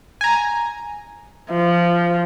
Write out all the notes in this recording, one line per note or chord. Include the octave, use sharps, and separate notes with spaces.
G#5 A#5
F3